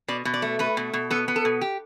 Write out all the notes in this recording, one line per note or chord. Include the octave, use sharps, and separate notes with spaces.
B2 D5
B2
D5
A3
A3 B4
B2
B2
B3 A4
B3
A4
B2
G4